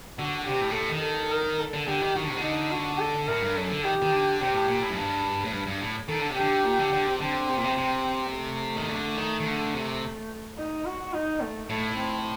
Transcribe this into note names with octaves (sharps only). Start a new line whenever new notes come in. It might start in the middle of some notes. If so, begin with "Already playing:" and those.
D3 F#4
C3 G4
A2
A#2
A2 A4
D#3
A4
A#4
A4
D3
D3 G4
D#3
D#3 F#4
D3
C3
D3
D#4
F#4
A4
A2 A#4
G2
F#2 A4
D3
D#3 G4
D#3
D3
C3 G4
A2
A#2
A2
F#2
G2
A2
G2
G2
A2
D#3 A4
D3
C3
D3 G4
A#2
D3
D3
C3
D3 C4
C3
A#2
C3
C3
A3
D#3
D3
D#3
D#3
D3
C3
D#4
F#4
D#4
A3
A2 A3
C4